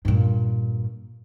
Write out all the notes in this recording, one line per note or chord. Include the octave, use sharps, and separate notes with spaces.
G2 A#2